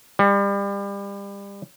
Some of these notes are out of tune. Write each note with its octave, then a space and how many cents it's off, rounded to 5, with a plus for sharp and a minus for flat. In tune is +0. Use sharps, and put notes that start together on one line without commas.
G3 +30